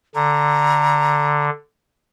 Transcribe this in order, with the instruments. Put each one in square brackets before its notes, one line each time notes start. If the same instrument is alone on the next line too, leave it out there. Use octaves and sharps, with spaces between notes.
[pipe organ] D3 [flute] A#5